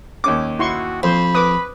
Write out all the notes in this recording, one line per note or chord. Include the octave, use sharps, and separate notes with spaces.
D#2 C#4 D6
E4 F#4 C6 C#6
F2 C5 B5
B4 D6 D#6